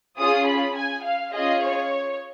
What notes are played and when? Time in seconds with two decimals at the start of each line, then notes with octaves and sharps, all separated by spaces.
0.18 C#4 F4 G#4 D#6
0.47 B5
0.76 G#5
1.05 F5
1.34 C#4 F4 G#4 D#5
1.63 C#5